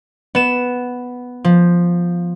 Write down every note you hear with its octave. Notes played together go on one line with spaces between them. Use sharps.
B3 E7
F3